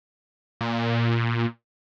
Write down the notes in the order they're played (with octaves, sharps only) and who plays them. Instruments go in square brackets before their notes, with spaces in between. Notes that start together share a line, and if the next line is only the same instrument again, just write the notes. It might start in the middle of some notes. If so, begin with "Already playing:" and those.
[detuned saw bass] A#2